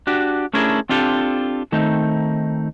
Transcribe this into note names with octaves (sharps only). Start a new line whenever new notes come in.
D4 F#4 G4
A3 C#4 D4 E4 G#4 A#4
C4 D4 F4 G4 A4
D#3 A3 C4 D#4